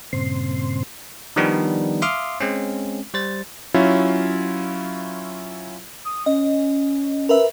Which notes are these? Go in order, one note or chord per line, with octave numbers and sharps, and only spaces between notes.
G2 A#2 C#3 C4 C6
D#3 F3 G3 B3 D4 D#4
E5 F5 C6 D6 D#6 F6
G#3 C4 C#4
G3 C5 A6
F#3 C#4 E4 F4
D#6
C#4 D#5
A#4 B4 E5